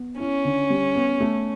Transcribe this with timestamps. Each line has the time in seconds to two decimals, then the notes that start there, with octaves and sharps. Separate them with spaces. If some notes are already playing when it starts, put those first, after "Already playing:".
Already playing: B3
0.19 C#4 E4
0.45 D3
0.70 G3
0.95 B3
1.20 A3